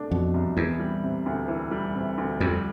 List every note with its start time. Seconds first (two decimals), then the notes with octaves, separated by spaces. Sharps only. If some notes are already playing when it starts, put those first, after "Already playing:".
Already playing: C2 B2 A3 D4
0.11 F2 B2
0.34 C2
0.57 E2 E3
0.79 G3
1.04 C3
1.26 D2
1.48 E3
1.71 G3
1.95 C3
2.18 D2
2.40 F2 G3